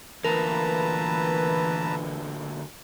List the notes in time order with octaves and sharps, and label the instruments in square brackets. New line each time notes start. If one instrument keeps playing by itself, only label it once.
[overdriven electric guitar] D2 A#2 [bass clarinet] E3 [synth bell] A#4 [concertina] B4 A5 A#5